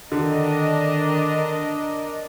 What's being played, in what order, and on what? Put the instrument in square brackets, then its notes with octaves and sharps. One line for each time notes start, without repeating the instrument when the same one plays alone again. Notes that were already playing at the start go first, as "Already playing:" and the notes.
[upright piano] D3 [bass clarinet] D#3 [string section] D4 A#4 D#5